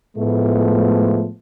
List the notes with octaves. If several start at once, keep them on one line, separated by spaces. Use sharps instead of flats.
A2 F3 G#3 A3 B3